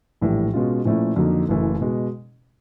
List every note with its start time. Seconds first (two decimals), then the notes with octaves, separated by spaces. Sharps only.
0.21 A#1 A2 E3 G3
0.54 B2 G#3 C#4 F4
0.85 A#2 F3 A3 C#4 E4
1.16 F2 D3 F#3 A#3 D#4
1.49 F#1 F#2 C#3 E3 A3
1.81 B2 G#3